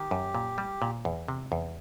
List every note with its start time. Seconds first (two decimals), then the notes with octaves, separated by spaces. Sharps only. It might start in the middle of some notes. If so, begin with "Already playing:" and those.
Already playing: D#3 G4
0.11 F#2
0.35 A#2
0.58 G3
0.82 A#2
1.05 E2
1.28 C3
1.52 E2